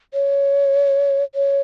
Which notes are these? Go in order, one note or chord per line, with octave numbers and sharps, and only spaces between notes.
C#5
C#5